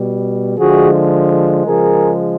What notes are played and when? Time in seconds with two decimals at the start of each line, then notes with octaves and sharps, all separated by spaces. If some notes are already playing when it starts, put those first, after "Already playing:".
Already playing: B2 G3
0.58 D3 F3 G#3 F#4 G#4
1.65 C#3 F3 G#3 G#4 A#4